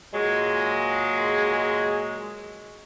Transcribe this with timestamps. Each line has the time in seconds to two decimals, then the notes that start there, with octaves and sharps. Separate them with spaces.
0.14 A#2 F#3 G#3